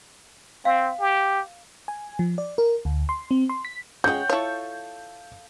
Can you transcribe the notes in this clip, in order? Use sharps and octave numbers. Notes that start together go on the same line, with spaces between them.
C4 F5
G4
G#5
F3
D5
A#4
D2
C6
C4
C6
B6
C#3 G#3 C#5 F#5 G5 G6
E4 F4 A4 C#5 C#6